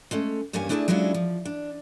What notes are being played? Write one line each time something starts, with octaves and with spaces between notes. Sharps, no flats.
G#3 A3 C#4
E2 G2 G3 A#3 C#4 G#5
A3 D4 E4 G#4 D5 A5
F#3 G#3 C#4 D4 E4 F4
F3
D4